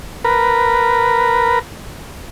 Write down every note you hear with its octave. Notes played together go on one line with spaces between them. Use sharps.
A#4 B4